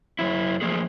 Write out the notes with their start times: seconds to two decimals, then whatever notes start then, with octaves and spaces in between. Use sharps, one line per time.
0.19 F#2 F#3 E4
0.61 F3 A3 A#3 G#4